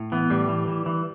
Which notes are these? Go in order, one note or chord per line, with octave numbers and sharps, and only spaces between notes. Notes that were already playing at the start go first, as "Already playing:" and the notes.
Already playing: A2
E3 B3
A2 G3
E3
E3
E3